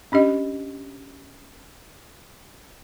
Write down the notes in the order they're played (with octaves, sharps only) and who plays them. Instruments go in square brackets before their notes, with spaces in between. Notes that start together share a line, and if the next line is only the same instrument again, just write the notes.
[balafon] C#4 D4 G4 D#5